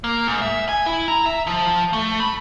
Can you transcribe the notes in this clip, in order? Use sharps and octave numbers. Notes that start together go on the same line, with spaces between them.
A#3
G#2
E5
G#5
E4
A#5
E5
F3
A3
B5